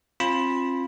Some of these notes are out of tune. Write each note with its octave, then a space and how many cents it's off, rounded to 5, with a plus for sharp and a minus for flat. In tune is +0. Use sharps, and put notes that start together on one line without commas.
C4 +35 F4 +0 B5 -10